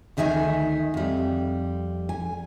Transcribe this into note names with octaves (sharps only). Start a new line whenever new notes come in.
D2 D#3 D#4 E5 G#5
F2 G3
G#5